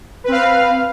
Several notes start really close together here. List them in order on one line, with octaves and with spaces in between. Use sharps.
B4 C4 F5